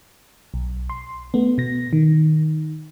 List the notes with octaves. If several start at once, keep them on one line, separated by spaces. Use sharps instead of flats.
B1
C6
A3 B3
B2 A#6
D#3